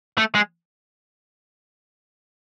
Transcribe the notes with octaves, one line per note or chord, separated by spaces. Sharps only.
A3
G#3